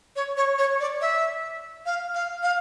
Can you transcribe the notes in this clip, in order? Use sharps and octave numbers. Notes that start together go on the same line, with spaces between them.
C#5
C#5
C#5
D5
E5
F5
F5
F5